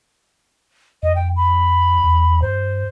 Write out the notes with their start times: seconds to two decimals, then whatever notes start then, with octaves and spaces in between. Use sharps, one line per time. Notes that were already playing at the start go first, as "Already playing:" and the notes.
1.03 F2 D#5
1.15 G5
1.36 B5
2.04 E2
2.42 G2 C5